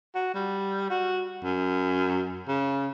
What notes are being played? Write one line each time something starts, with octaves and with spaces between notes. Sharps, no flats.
F#4
G3
F#4
F#2
C#3